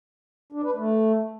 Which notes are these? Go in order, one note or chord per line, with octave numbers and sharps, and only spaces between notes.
D4
B4
A3